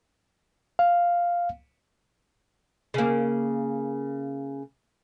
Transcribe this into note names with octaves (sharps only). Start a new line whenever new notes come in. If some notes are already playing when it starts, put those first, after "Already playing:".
F5
C#3 A#3